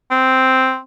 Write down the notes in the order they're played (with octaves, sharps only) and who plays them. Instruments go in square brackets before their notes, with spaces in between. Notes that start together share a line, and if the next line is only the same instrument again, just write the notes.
[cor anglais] C4